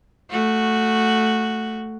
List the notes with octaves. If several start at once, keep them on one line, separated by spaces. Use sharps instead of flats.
A3 F#4